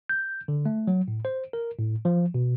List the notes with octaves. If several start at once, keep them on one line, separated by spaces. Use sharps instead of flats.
G6
D3
A3
F#3
A2
C5
A#4
A2
F3
B2